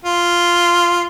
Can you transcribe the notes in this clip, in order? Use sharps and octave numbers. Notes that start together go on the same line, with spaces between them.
F4